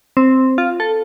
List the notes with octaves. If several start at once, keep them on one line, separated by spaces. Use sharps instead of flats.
C4
F4
A4